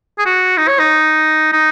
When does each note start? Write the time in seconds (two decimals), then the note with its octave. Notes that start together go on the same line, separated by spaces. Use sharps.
0.19 G#4
0.26 F#4
0.57 D#4
0.68 C#5
0.79 D#4
1.53 D#4